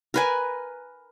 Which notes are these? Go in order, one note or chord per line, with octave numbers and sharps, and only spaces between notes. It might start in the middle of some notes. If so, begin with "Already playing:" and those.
A#4 B4 G#5